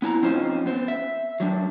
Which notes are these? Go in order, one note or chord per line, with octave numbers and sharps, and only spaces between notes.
B3 E4 G#5 A#5
F3 C4 C#4 D#4 F4 C5
B3 C5
E5
F#3 G3 D4